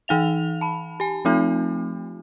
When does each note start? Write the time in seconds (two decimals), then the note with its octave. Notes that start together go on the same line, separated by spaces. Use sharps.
0.08 E3 D#4 F5 F7
0.61 A5 B5
1.00 G4 G#5
1.25 F3 A3 C4 D#4 F4